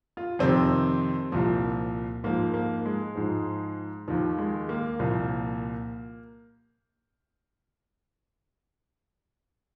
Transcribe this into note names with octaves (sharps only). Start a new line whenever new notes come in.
F4
F2 C3 D#3 C4
C2 A#2 F3
G#2 F3 A#3
A#3
G#3
G#2 F3
D#2 D#3 F3
G#3
A#3
C2 A#2 F3